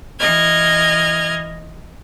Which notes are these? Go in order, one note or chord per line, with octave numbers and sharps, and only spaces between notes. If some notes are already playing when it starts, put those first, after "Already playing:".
E3 D#5 F6 G#6